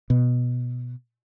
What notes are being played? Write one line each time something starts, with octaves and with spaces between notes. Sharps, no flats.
B2